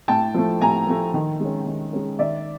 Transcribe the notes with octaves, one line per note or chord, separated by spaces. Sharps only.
A2 G5 A5
F3 A3
A2 G#5 A#5
F3 A3
D#3
G#3 C#4
D#3
G#3 C#4
D#3 D5 E5